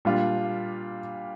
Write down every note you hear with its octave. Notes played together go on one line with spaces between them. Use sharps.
A#2 G3 D4 F4